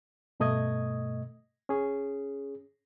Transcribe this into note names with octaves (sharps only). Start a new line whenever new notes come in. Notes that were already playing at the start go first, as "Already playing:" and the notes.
G2 B2 A3 D#5 D#6 G#6
C#4 G#4